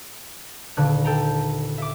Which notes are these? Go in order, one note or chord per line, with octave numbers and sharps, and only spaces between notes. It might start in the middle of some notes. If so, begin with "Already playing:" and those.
D#1 D3 F#6
A4 G5 A#5
E5 D6